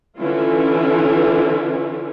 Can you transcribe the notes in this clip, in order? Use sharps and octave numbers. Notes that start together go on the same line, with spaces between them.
D3 E3 C#4 E4 F4